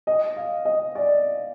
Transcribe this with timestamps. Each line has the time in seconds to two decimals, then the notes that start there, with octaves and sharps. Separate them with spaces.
0.07 D#5
0.36 F5
0.65 D#5
0.95 D5